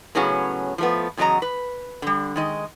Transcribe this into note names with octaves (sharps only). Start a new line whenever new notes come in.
A2 C#3 F#3 B3 C#4 G#4
F3 A3 B3
E2 C#3 F#3 F4 D#5 A#5
B4
D3 G3
D#3 G#3 D#5